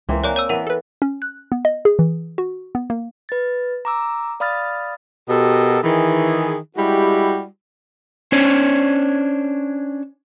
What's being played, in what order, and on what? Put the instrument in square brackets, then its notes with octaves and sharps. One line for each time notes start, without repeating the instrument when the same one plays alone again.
[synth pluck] C#2 [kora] E3 A#3 C4
[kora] A#3 [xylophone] C#5 D5 G#5 [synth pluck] F#6
[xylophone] C#5 A#5 E6
[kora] E3 B3 [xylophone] A#4 F#5 D#7
[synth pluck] A4 B4
C#4
F#6
B3
D#5
G#4
E3
F#4
B3
A#3
[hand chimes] B4 A6
A#5 D6 E6
D5 F5 B5 D#6 F6 A6
[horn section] B2 F#4 G4 A4 A#4 D#5
D#3 E3 G#4
G3 G#3 E4 F#4 G4
[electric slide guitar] C#4 D4 C5 C#5